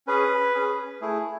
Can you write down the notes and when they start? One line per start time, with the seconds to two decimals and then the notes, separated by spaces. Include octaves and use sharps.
0.07 C#4 G#4 B4
0.55 C#4 G#4
1.01 A3 E4 G#4